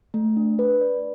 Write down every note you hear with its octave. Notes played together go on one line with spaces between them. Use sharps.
A3
D4
B4
D5